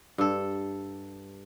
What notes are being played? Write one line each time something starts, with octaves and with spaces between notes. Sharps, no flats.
G2 A4